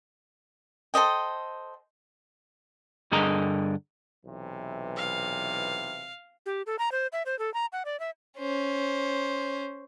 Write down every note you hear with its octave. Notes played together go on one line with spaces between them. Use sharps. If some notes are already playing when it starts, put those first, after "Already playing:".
A4 C5 D#5 G5
G2 D3 G#4 A#4 D#5 A#5
B1 C3 E3
F5
G4
A4
A#5
C5
E5
C5
A4
A#5
F#5
D5
E5
C#4 C5